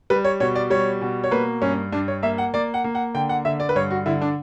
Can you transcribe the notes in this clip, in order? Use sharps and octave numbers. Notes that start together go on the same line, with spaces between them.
G3 B4
C#5
B2 C#5
D5
G3 C#5
B2
C#5
A#3 B4
G2 C#4
G2 D4
C#5
A#3 E5
F#5
A#3 D5
F#5
A#3
F#5
D3 G5
F#5
D3 E5
D5
B4
G2 C#5
F#4
D3 E4
D4